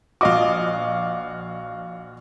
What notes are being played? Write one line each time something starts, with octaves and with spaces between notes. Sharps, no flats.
A#1 F#4 D#5 F5 D6